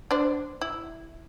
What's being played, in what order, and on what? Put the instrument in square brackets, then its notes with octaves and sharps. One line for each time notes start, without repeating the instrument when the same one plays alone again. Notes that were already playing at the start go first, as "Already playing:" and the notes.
[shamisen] D4 C5
E4